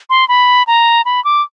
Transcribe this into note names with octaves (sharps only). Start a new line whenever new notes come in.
C6
B5
A#5
B5
D6